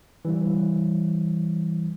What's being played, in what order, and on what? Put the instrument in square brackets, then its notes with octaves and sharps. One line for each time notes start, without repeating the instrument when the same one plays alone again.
[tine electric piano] E3 G3